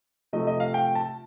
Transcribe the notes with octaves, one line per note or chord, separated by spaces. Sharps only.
C3 F3 A3 D#5
D#5
F5
G5
A5